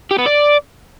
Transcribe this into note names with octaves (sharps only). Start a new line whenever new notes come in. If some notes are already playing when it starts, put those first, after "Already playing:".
G4
B3
D5